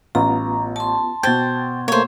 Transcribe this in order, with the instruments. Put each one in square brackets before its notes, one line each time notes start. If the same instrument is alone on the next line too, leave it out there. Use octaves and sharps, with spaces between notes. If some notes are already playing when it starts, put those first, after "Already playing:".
[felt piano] A1 [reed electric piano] B3 F4 [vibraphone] A#5
[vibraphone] A5 C6
[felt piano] B2 G#6 [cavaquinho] C5 [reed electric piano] G5 A6
[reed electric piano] A3 A#3 [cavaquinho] C5 C#5